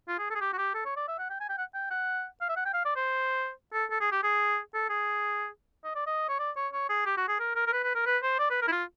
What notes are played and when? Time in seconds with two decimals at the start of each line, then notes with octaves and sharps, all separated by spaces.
0.08 F4
0.19 G#4
0.31 A4
0.35 G#4
0.41 G4
0.53 F#4
0.58 G4
0.74 A4
0.85 C#5
0.97 D5
1.08 E5
1.18 F#5
1.30 G5
1.41 G#5
1.49 G5
1.58 F#5
1.74 G5
1.90 F#5
2.41 F5
2.49 E5
2.57 F#5
2.65 G5
2.74 F5
2.85 D5
2.96 C5
3.73 A4
3.90 A4
4.01 G#4
4.12 G4
4.23 G#4
4.74 A4
4.90 G#4
5.85 D#5
5.95 D5
6.07 D#5
6.29 C#5
6.39 D5
6.56 C#5
6.73 C#5
6.89 G#4
7.06 G4
7.18 F#4
7.28 G#4
7.40 A#4
7.56 A#4
7.67 A#4
7.73 B4
7.84 B4
7.95 A#4
8.06 B4
8.23 C5
8.39 D5
8.50 B4
8.62 A#4
8.68 E4
8.72 F4